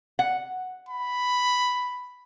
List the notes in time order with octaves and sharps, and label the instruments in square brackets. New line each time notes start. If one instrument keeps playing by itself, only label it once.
[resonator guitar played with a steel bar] F#5
[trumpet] B5